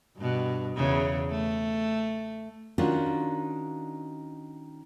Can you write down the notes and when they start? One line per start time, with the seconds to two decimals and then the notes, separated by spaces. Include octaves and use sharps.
0.17 G2 B2
0.76 E2 C#3
1.31 A3
2.78 D#3 C#4 D4 F4 F#4